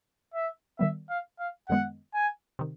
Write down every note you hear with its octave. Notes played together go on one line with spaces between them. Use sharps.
E5
D#3 G3 B3 E5
F5
F5
F#2 D#3 G#3 B3 F#5
G#5
C3 D#3